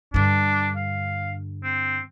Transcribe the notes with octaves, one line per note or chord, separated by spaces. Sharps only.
G2 D3 D4
F5
C4